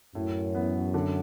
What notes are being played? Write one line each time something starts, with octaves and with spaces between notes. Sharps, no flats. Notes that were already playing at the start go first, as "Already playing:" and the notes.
F#2 A2
E3 B3
D3